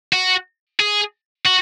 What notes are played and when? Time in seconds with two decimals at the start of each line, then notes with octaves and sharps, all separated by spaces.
0.13 F#4
0.80 G#4
1.46 F#4